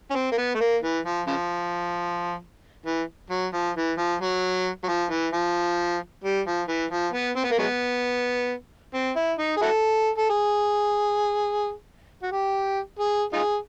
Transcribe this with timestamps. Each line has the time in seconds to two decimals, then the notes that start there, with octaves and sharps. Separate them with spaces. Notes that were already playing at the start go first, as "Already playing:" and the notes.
0.10 C#4
0.15 C4
0.32 A#3
0.38 B3
0.55 A3
0.60 A#3
0.82 E3
1.05 F3
1.27 C#3 F3
2.86 E3
3.30 F#3
3.54 F3
3.76 E3
3.98 F3
4.21 F#3
4.84 F#3
4.88 F3
5.11 E3
5.33 F3
6.24 G3
6.46 F3
6.68 E3
6.91 F3
7.13 B3
7.36 C4
7.44 B3
7.51 A#3
7.59 F#3 G#3 B3
8.94 C4
9.16 E4
9.38 D#4
9.57 G#4
9.62 E4 F#4 A4
10.18 A4
10.29 G#4
12.23 F#4
12.32 G4
12.99 G#4
13.33 D#4 F4 G#4